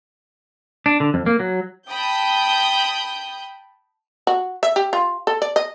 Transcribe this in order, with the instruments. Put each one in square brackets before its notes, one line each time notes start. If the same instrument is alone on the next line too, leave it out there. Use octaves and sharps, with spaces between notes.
[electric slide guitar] D4
D3
F2
A#3
F#3
[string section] G5 A5 B5 D#6 G6
[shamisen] F#4
E5
G4
F4
A4
D5
D#5